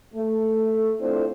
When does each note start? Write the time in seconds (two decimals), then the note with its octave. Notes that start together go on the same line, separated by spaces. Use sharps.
0.14 A3
1.00 C4 D4 E4 F4 A4 C5